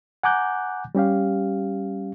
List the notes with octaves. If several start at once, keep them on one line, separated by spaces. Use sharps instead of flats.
F#5 G#5 A#5 D6 F#6 G6
G3 C#4 G4 F5